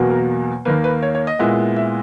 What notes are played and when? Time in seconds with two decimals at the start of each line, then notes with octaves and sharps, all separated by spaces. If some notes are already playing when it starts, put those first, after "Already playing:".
Already playing: E2 B2 F#3 A#3
0.10 A#4
0.65 D#2 D#3 A#3 B4
0.84 B4
1.03 C#5
1.15 C#5
1.27 D#5
1.39 A#2 G#3 B3 E4
1.76 E5